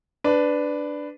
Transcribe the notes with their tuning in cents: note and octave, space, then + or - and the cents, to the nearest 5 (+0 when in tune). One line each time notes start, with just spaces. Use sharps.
D4 +0 B4 +10